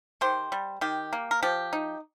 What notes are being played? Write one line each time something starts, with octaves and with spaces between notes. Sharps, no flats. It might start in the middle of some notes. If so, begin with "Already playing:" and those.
D#3 G4 C5
G3
D#3 G4
A#3
A#4
F3 G4
D#4